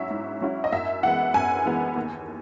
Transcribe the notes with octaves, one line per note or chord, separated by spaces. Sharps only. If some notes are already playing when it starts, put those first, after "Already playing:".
Already playing: G#2 F#3 C#4 E4 E5
G#2
F#3 C#4 E4
D#5
F#2 E5
E3 G#3 B3 F#5
F#2 G#5
E3 G#3 B3
D#2